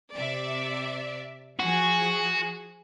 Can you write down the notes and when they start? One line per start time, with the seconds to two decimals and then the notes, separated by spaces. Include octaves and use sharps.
0.15 C3 D5 E5
1.59 F3 F#4 G#4